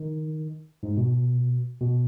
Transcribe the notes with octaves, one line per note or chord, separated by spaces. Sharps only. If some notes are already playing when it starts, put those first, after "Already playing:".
Already playing: D#3
G#2
B2
B2